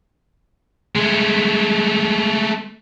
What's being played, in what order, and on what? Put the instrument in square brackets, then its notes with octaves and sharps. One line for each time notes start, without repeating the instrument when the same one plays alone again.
[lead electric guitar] G#3 A3